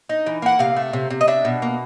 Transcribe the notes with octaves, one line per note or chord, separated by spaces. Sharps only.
D#4
E3
A#3 F#5
C3 F5
A3
C3
C3
D#5
D4 E5
B2
A#3